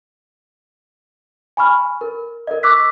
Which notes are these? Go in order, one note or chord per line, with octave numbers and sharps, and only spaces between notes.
G#5 B5 C#6 F6
A#4
A#4 D#5
C#6 D6 E6 F#6 B6